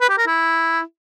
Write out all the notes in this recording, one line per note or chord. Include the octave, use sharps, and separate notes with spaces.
B4
G4
A#4
E4